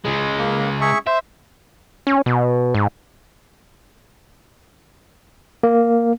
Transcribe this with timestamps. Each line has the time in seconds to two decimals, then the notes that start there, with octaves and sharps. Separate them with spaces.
0.05 C#3 G#3
0.39 A#3
0.81 G#4 E5 C#6
1.07 C5 E5
2.07 C#4
2.26 B2
2.75 G#2
5.63 A#3